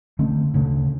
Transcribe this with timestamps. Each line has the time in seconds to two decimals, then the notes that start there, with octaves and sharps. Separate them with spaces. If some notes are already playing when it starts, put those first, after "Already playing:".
0.19 D3 A3 C4
0.54 D2 C#3 A3